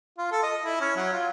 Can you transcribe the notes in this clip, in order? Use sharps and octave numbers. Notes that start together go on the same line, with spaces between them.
F4
A4
D#5
E4
C#4
F#3
F4